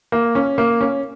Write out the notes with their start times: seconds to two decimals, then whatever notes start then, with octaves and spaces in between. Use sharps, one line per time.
0.12 A#3
0.35 C#4
0.58 A#3
0.81 C#4